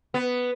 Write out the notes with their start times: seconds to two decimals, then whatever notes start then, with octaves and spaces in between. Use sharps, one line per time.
0.14 B3